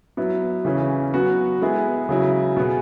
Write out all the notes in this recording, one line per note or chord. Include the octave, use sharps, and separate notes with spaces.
F#3 B3 E4
C#3 E3 C#4
F#3 B3 F#4
G#3 B3 E4 G#4
C#3 F#3 E4
B2 B3 G#4